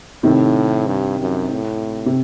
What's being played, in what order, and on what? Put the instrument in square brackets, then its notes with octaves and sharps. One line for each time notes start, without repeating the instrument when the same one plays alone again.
[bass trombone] A2 [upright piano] C3 D#3
[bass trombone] G2
F#2
A2
[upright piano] C3